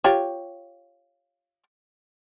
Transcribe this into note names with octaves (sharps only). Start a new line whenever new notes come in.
F4 G4 C#5